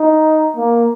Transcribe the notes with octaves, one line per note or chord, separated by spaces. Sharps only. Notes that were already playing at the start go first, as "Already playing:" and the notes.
Already playing: D#4
A#3